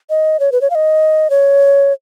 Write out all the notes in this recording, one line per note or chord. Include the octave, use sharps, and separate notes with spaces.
D#5
C#5
B4
C#5
F5
D#5
C#5